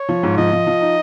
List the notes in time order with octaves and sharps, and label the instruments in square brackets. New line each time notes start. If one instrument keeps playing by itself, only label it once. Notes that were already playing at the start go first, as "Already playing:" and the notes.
Already playing: [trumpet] C#5
[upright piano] F3
G#2
[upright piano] F3 [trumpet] D#5
[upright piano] F3
F3
D#4